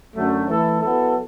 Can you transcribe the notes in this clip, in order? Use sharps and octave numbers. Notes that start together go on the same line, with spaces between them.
F#2 D3 F#3 A3
E3 A3 E4 A4
F#3 B3 E4 A4